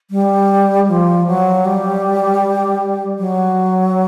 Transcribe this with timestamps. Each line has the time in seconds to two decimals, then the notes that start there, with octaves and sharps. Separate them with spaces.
0.11 G3
0.88 F3
1.27 F#3
1.65 G3
3.19 F#3